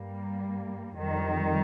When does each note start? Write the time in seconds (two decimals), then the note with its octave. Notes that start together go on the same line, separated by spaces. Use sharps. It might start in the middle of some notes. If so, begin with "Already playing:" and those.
Already playing: G2 G3 A#3
0.96 F2 D#3 G3